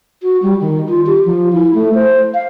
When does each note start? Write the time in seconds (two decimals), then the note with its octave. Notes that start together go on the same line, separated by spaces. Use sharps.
0.23 F#4
0.42 G3
0.61 D#3
0.89 F4
1.06 G4
1.25 F3
1.53 E4
1.74 A3
1.94 C5
2.34 F5